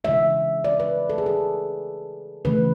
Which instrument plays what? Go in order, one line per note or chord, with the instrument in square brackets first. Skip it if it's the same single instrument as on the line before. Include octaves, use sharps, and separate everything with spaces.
[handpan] C#3 E3 G#3 E5
D5
B4
A4
G#4
A4
C#3 E3 A3 B4